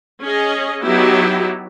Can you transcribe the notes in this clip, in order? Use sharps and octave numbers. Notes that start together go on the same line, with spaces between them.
C#4 G#4 D#5
F#3 B3 D#4 E4 F#4 G4